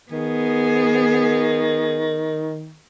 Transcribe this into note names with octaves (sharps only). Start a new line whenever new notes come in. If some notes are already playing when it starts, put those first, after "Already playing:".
D#3 B3 G#4